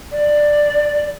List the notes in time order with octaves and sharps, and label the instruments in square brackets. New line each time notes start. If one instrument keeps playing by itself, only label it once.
[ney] D5